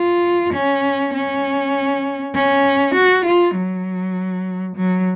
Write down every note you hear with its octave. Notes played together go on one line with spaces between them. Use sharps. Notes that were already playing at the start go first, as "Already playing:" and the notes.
Already playing: F4
C#4
C#4
C#4
F#4
F4
F#3
F#3